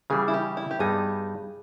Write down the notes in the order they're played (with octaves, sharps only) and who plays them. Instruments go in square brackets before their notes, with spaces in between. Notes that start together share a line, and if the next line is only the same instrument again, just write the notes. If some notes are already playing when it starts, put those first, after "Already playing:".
[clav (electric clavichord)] C#3 E3 G3 [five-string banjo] G#4
[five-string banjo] E4
G4
E4
G4
[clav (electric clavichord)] G2 G3 B3 D#4 [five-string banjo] G#4